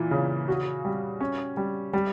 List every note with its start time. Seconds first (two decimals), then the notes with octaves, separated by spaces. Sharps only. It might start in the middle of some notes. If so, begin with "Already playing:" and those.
Already playing: A#2 E3
0.11 C#3
0.48 F#4
0.85 G3
1.21 C#4
1.57 G3
1.93 G3